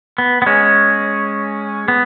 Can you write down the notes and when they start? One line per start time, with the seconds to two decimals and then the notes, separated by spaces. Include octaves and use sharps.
0.18 B3
0.42 B3
0.46 G#3 C#4
1.88 B3